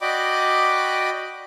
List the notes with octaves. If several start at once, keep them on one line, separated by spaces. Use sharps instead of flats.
F#4 D5 D#5 G5 B5 D6